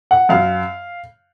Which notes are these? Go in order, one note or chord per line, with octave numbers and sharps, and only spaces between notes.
F#5
F#2 F5